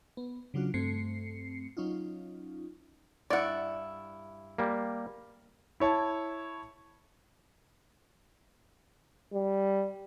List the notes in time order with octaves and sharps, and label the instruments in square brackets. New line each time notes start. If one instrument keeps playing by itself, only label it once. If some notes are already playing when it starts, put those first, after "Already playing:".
[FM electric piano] B3
C#3 F#3 D4 F4 F#4
G2 A3 C4 C7 C#7
F#3 C#4 D#4 F4
[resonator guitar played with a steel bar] G2 E4 [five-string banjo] D5 F#5
[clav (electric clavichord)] G3 A#3
[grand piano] E4 C#5 A5
[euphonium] G3